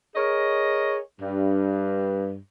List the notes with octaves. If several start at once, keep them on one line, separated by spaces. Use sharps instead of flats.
G#4 A#4 C#5 D#5
G2